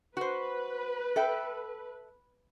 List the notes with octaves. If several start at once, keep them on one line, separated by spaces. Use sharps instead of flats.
F#4 B4 C5
A4 E5 G5